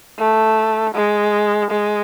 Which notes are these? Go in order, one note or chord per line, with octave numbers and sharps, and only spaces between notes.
A3
G#3
G#3